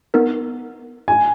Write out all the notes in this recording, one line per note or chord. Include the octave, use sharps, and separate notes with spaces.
B3 D#4 A#4
G#5